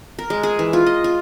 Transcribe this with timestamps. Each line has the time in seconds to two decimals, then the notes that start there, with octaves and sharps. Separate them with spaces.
0.19 A#4
0.30 G#3
0.43 G#4
0.59 E3
0.73 F4
0.86 D#5
1.04 F4